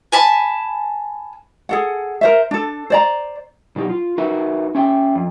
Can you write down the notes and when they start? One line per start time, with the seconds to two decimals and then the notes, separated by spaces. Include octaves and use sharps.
0.12 G#5 A5 B5
1.69 G#4 A4 F#5
2.21 A#4 C5 E5
2.51 D4 A4
2.90 C5 D5 A#5
3.76 B2 F#3 D#4 G4
3.89 F4
4.18 D#4 F#4 A#4 B4 E5
4.75 C#4 E5 G5
5.15 F2